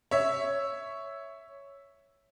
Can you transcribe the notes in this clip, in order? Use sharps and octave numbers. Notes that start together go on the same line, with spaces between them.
C#5 E5